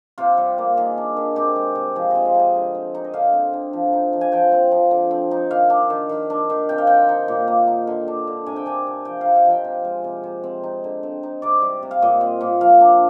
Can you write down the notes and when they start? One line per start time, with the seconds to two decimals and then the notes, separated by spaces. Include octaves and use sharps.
0.18 C3 F4
0.37 G3
0.58 A#3
0.77 D#3 G#4
0.98 D4
1.17 D#3
1.36 C3 G4
1.56 G#3
1.75 C3
1.96 F3 G#4
2.11 C4 D#5
2.25 F5
2.35 D#4 D#5
2.55 D3
2.75 C4
2.95 D#4
3.04 D#5
3.13 D3 F5
3.33 C4
3.53 D3
3.73 F3
3.93 D#4
4.13 F3
4.21 G#5
4.32 F3 G5
4.52 C4
4.71 F3
4.91 D3
5.11 C4
5.31 D#4
5.51 D#3 F5
5.70 D4
5.90 D#3
6.09 D#3
6.30 D4
6.50 D#3
6.69 C3 G5
6.78 F5
6.87 C4 G5
7.09 D#4
7.28 A#2
7.48 A#3
7.68 D#4
7.87 D3
8.08 D4
8.27 D3
8.46 C3 G#5
8.56 G5
8.66 D4 G#5
8.87 C3
9.05 F3 G5
9.21 D#4 F5
9.36 F5
9.46 F3 G5
9.64 C3
9.84 G#3
10.04 C3
10.24 C3
10.44 C4
10.64 D#4
10.84 D3
11.03 C4
11.23 D#4
11.42 C3 D5
11.62 G3
11.82 C3
11.91 F5
12.02 A#2 D#5
12.21 C4
12.41 A#2
12.61 F3 F5
12.81 D4